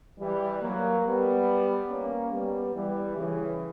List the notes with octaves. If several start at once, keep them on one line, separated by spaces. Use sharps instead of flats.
E3 G3
F#3 A#3
G3 B3
A#3 C#4
G3 B3
E3 G3
C#3 E3